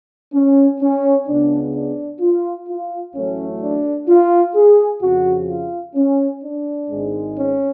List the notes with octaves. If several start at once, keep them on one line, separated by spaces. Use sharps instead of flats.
C#4
C#4
C#2 C#3 G#3 B3 D4
D4
F4
F4
A1 A2 F#3 A3 C#4
D4
F4
G#4
F2 C#3 F3 F#4
F4
C#4
D4
G#1 G#2 G#3
C#4